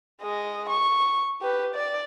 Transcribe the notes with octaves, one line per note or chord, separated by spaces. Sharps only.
G#3 D#5
C#6
G4 B4
D5